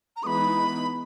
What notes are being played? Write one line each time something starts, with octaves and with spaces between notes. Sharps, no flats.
A#5
E3 G#3 B3 D#4 B5 D#6